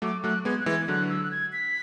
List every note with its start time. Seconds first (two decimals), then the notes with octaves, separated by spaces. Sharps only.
0.02 F#3 A3 D6
0.24 F#3 A3 F#6
0.45 G#3 B3 G#6
0.60 F#6
0.66 E3 G#3 G#6
0.88 D3 F#3 F#6
1.10 E6
1.24 F#6
1.31 G#6
1.53 B6